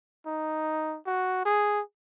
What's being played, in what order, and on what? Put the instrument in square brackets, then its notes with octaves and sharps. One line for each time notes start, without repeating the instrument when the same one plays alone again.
[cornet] D#4
F#4
G#4